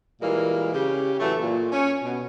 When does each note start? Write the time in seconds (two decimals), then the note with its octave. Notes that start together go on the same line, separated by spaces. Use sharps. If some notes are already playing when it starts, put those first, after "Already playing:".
0.22 A#2 E3 G3 G#3 A#3 F5
0.74 C#3 G4
1.20 A2 E3 F#3 A3
1.41 A#2
1.72 C#4
2.04 B2